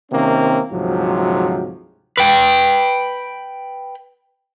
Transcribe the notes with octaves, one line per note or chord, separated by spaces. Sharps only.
C3 D#3 A#3 C4 C#4
D2 G#2 C3 F3 F#3
B4 G5